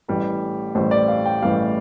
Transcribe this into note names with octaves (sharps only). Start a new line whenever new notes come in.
A1 A2 E3 G3
A1 A2 E3 G3 C5
D5
F5
G5
A1 A2 E3 G3 F5